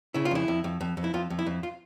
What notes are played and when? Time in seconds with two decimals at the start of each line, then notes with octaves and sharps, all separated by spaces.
0.14 C#3 E4
0.25 F4
0.31 F2 E4
0.48 F2
0.64 F2
0.81 F2
0.97 F2
1.04 E4
1.14 F2 F4
1.30 F2
1.39 E4
1.46 F2
1.63 F4